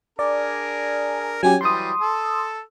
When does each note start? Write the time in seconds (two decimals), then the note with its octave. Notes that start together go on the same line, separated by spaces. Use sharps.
0.19 D4 G#4 A#4 D5
1.43 F#3 C#4 G4 G#5
1.61 E3 F#3 G3 C6 D#6
2.01 A4 E6